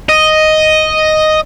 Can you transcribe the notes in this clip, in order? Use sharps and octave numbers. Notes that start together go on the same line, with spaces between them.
D#5